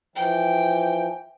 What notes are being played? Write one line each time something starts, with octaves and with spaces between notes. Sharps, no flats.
E3 F3 G5